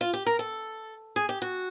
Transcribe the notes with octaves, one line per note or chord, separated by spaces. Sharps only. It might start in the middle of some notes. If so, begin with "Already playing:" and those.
F4
G4
A#4
A4
G#4
G4
F#4